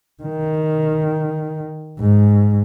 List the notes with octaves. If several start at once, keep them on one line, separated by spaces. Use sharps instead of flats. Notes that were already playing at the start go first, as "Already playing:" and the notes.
D#3
G#2